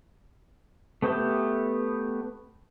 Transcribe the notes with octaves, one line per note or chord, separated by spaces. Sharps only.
A3 B3 G4 E5 G5